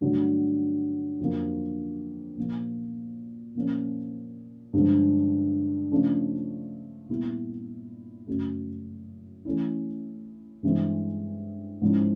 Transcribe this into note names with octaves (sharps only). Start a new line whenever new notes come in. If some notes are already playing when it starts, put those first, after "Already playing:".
G2 D3 F#3 A3
F2 D3 F#3 A#3
A#2 F3 A#3
A#2 F3 A#3 C#4
G2 D3 F3 G#3
C#3 F3 A3 D4 F4
A#2 G3 B3 E4
F#2 C#3 F#3 A3
E3 A3 C#4 E4
G2 E3 G#3 C4
G#2 F3 G#3 C#4 E4